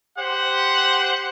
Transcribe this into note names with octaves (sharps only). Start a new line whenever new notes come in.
G4 C5 F#5